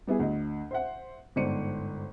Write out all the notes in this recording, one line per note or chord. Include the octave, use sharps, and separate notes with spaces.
G3 B3 E4 G#4
D2 D#5
C5 E5 F#5
G1 G#2 C5 D5 C#7 D#7